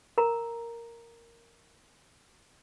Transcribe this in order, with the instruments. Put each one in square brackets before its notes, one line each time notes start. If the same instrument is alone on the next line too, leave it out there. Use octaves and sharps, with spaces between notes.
[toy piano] A#4 A#5